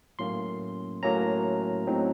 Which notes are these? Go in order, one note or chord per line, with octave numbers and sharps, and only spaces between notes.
A2 F#3 A#3 C#4 C6
A2 F#3 A#3 C#4 A#5
A2 F#3 C4 D#4